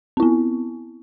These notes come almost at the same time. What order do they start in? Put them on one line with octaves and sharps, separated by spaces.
C4 E4 B3